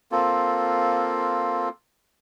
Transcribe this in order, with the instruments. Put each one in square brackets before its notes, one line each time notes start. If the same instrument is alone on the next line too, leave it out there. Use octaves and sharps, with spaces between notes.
[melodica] A#3 C4 F4 A4